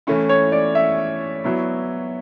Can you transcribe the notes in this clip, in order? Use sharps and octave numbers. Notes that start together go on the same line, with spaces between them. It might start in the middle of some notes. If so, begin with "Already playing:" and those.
E3 A3 C#4 E4
C#5
D5
E5
F#3 B3 E4